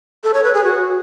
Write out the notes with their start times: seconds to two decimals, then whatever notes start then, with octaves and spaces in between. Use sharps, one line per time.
0.24 A4
0.34 C#5
0.44 B4
0.54 G#4
0.64 F#4